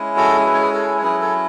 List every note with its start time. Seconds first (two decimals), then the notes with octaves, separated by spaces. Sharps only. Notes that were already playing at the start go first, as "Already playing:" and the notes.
Already playing: G#3 C#4 E4
0.17 F#4 A4
0.46 B4
0.54 C#5
0.62 G#4 B4
0.73 A4 C#5
0.98 C#5
1.02 F#3 C#4 E4 G#4 B4
1.21 A4 C#5